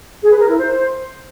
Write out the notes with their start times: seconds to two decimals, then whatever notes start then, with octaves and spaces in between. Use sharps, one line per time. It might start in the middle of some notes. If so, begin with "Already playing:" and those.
0.22 G#4
0.31 B4
0.40 A#4
0.48 E4
0.57 C5